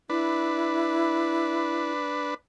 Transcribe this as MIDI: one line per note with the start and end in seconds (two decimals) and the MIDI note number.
0.10 2.34 62
0.10 1.92 64
0.10 2.34 71